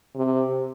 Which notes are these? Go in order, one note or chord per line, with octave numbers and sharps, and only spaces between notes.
C3